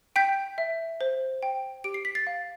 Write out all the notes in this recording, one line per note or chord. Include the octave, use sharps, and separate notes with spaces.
G5 G6 B6
E5
C5
G5
G4 D7
C7
B6
A6 C7
F5